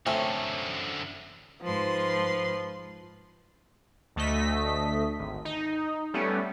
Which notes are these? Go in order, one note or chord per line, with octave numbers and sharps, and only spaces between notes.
F#2 D3 A3 C4 C#4
G#2 F3 B4 C6
D2 A3 D#5 B6
G#1
D#4
G3 A3 B3 C#4